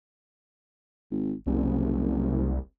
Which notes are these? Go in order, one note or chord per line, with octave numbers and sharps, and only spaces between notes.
G#1
F#1 C2